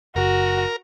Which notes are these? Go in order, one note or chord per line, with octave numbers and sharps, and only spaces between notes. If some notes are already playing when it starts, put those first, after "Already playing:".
F#1 F#4 A#4